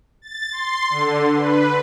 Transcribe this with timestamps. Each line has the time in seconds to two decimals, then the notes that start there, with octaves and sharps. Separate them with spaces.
0.22 A6
0.51 C6
0.90 D3
1.35 B4